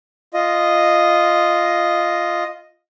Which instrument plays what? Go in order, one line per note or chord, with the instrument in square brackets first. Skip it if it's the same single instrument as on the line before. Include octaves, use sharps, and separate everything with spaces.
[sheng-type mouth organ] F4 D#5